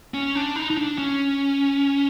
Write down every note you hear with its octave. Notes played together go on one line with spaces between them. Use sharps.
C#4
D4
D#4
D#4
D4
C#4